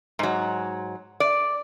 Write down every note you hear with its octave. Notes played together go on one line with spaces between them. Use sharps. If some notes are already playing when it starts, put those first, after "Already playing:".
G#2 F#3
D5